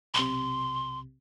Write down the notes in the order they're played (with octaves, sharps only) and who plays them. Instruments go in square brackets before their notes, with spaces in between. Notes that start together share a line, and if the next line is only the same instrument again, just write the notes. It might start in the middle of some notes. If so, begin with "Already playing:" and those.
[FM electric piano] B1 C3 [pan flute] C6